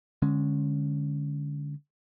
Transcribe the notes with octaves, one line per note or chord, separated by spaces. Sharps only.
D3 G#3 C#4